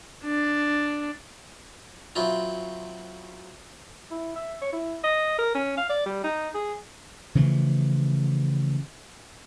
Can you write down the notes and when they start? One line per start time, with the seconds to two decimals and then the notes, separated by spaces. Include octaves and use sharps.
0.24 D4
2.16 F#3 C4 E4 F4
4.11 E4
4.36 E5
4.61 C#5
4.73 E4
5.03 D#5
5.38 A#4
5.54 C#4
5.77 F5
5.89 D5
6.06 G3
6.24 D#4
6.54 G#4
7.35 C#3 E3 F3 A3